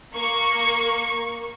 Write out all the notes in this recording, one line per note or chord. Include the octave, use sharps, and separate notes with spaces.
A#3 C#6